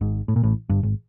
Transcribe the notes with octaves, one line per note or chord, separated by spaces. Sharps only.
G#1 G#2
A2
A#2
A1 A2
G1 G2
G#1